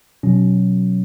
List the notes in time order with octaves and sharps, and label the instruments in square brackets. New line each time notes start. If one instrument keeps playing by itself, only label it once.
[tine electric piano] B2 F#3 C#4